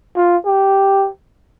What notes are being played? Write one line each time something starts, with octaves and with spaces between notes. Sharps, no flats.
F4
G4